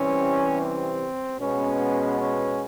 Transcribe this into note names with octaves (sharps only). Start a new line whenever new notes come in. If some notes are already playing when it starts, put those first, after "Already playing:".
Already playing: C3 E3 G3 C4 C#4
C4
B2 G#3 B3 C#4
C#4